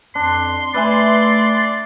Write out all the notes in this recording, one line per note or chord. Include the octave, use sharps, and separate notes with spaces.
F2 D4 C6
A3 B4 D5 E5 G#5